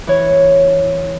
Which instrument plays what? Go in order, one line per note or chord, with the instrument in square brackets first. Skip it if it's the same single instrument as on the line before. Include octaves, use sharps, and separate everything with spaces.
[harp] E3 C#5